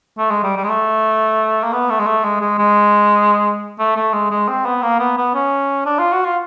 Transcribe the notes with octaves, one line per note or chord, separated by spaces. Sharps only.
A3
G#3
G3
G3
G#3
A3
A#3
B3
A3
G#3
A3
G#3
G#3
G#3
A3
A3
G#3
G#3
C4
B3
A#3
B3
B3
C#4
D4
F4
F#4
F4